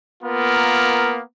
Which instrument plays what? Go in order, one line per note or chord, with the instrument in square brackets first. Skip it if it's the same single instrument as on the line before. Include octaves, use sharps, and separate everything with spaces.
[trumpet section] A#3 B3 F4 A#4